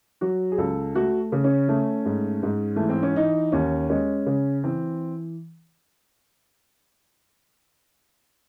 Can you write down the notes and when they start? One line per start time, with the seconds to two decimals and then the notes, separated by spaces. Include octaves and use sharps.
0.21 F#3 F#4
0.52 G#4
0.58 C#2 A4
0.95 A3 F#4
1.32 C#3
1.44 C#4
1.68 A3
2.05 G#2
2.43 G#2
2.76 E3 A3
2.89 C4
3.03 C#4
3.16 E3 D#4
3.52 D#2 C#4
3.90 G#3 C#4
4.26 C#3
4.63 E3 C4